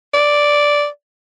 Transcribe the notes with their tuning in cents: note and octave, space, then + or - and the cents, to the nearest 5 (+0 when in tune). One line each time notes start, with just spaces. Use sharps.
D5 -5